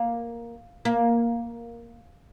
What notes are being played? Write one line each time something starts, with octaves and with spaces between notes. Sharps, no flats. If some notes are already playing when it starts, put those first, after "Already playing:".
Already playing: A#3
A#3